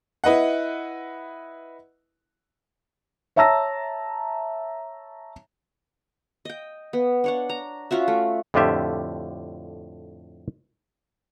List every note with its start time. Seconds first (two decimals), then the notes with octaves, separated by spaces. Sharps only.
0.24 E4 B4 D#5 F#5
3.36 C#5 E5 A5 A#5 E6 A#6
6.45 D#5 G5
6.93 B3
7.24 D4 C#5 F#5
7.49 A#5
7.91 C#4 F4 F#4 E5
8.08 A3
8.54 F2 A2 D3 F4 G4 E5